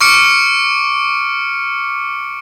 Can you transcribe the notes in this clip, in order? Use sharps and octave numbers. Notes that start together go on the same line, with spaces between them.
C#6 D6 F6 C#7 D7